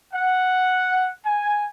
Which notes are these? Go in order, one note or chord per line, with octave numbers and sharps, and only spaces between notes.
F#5
G#5